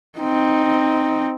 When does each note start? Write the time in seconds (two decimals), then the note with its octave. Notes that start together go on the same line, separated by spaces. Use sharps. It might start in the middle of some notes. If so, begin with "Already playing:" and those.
0.19 C4 D#4